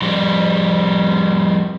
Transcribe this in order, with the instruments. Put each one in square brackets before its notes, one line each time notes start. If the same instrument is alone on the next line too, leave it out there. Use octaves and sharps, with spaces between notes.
[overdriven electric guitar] F2 G3